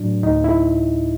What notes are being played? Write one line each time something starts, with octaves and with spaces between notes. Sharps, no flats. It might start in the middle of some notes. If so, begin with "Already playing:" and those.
Already playing: A2 F#3 D4
D2 D#4
E4